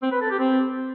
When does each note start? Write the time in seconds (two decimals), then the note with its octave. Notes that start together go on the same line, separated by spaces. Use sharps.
0.02 C4
0.12 B4
0.21 A4
0.30 G4
0.39 C4